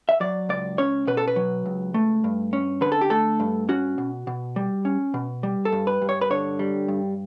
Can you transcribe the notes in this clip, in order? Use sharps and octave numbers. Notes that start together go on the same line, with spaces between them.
E5
F#3 D5
C#2 D5
C#4 C#5
B2 B4
A4
B4
F#3
C#2
A3
G2
C#4
D3 B4
A4
G4
A3 A4
G2
C#4 F#4
B2
B2
G3
C#4
B2
G3
A4
G2
B4
G2
C#5
B4
D3 C#5
G3
G2